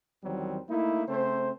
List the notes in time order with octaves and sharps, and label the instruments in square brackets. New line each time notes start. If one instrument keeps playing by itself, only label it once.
[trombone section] E2 D#3 F#3 G3 C4
A3 A#3 D#4 E4
C#3 A3 C4 C5